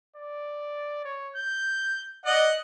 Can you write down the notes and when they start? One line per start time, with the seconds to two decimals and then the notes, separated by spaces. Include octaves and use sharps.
0.16 D5
1.05 C#5
1.36 G6
2.26 D5 D#5 F#5